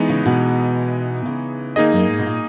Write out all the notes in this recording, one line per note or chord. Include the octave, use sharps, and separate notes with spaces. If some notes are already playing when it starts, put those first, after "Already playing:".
Already playing: E3 G#3 B3 D#4
C#3
B2
C#3
D#3 A#3 D#4 G#4 D#5
F#2
G#2
B2
A#2